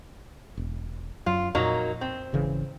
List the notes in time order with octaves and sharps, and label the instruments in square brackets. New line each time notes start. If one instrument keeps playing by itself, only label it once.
[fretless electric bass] E1
[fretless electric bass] F#2 F#3 [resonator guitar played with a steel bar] F4
[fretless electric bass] F2 A#2 [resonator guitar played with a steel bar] F#3 A#3 D#4
[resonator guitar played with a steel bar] C4
[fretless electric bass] G#1 C#3 E3